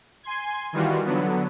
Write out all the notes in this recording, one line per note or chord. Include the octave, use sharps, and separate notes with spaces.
G#5 C6 G#6
D#3 E3 G3 F4 F#4
D3 F#3 B3